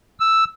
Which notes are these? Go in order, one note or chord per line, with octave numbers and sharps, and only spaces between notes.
E6